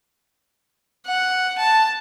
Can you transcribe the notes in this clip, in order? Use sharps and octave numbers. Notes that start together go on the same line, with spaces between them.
F#5
A5